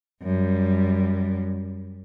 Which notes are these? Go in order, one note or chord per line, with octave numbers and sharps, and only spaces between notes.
F#2 G3